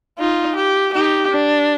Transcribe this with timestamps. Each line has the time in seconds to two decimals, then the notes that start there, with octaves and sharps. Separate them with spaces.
0.19 D#4 F4
0.56 G4
0.94 D#4 G4
1.31 D4